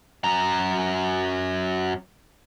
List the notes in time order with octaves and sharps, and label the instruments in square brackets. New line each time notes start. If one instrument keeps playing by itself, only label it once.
[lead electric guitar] F#2 A#5